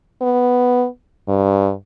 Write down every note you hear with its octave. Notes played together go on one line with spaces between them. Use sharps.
B3
G2